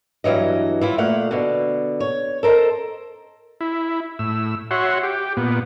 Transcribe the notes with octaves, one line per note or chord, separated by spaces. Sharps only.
G2 D#3 E3 F#3 D#5
E3 E4 F4
A#2 A3 F5 F#5
B2 D3
C#5
A4 A#4 C5 D#5
E4
A2 E6
F#4 C#5 E5 F#5 C6
G4
A#2 B3